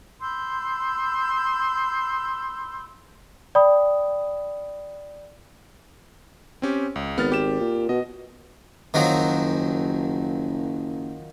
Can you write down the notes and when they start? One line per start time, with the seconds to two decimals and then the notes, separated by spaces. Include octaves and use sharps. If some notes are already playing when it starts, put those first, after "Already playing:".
0.21 B5 C6 E6 G6
3.55 D5 G5 B5 D#6
6.62 C4 C#4 G4
6.96 C#2
7.18 G#1 B3 F6 A6
7.32 G4 E7
7.60 A#2
7.89 B2 D#5
8.94 F#1 D#3 F3 F#3